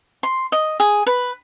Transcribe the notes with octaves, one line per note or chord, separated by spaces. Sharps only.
C6
D#5
G#4
B4